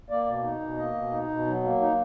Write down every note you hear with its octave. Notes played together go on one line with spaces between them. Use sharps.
A#3 D5
B2
D#4
B2
A#3 D#5
B2
D#4
B2
F#3
A#3
D#4